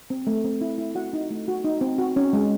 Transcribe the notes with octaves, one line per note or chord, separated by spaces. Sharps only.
C4
A3
C4
E4
E4
F#4 F#5
D#4
A3
F#4
D#4
C4
F#4
C#4
G#3